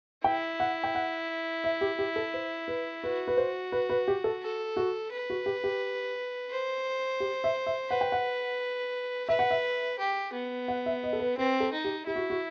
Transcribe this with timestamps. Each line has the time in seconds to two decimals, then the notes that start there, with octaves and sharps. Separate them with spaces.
0.24 E4 G5
0.60 F#5
0.84 G5
0.95 F#5
1.64 E5
1.81 G4
1.99 G4
2.16 A4
2.34 C5
2.68 B4
3.03 F#4 B4
3.28 B4
3.37 C5
3.72 B4
3.90 B4
4.08 G4
4.24 A4
4.43 A4
4.77 F#4
5.12 B4
5.30 F#4
5.46 G4
5.64 G4
6.51 C5
7.20 G4
7.44 E5
7.66 E5
7.90 B4 F#5
8.01 G5
8.12 F#5
9.29 B4 E5
9.39 F#5
9.51 E5
9.99 G4
10.33 B3
10.68 F#5
10.86 E5
11.04 D#5
11.13 A4
11.20 B4
11.37 C4 B4
11.60 A4
11.73 D#4
11.84 G4
12.07 E4 G4
12.16 F#4
12.30 F#4